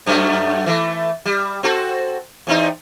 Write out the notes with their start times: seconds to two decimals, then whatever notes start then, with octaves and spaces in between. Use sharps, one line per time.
0.06 F#2 F#3 A3
0.66 E3 A3
1.25 G3
1.63 C4 F#4 A4
2.47 E2 C4 D#4